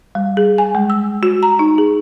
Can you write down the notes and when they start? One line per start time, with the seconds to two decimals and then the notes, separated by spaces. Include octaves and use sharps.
0.15 G3
0.37 G#4
0.58 G#5
0.75 G#3
0.90 E6
1.23 F#4
1.43 A#5
1.59 D#4
1.78 G#4